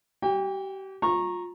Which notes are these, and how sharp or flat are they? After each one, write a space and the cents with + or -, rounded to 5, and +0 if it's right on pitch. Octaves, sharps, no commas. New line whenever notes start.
G4 -35 G5 +35
F4 +25 A#5 +0 C#6 -20